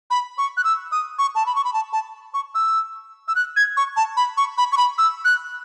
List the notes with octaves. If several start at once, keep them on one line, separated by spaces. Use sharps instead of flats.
B5
C#6
F#6
E6
D#6
C#6
A5
B5
C#6
B5
A5
A5
C#6
E6
E6
F#6
G#6
C#6
A5
B5
C#6
B5
C#6
B5
E6
F#6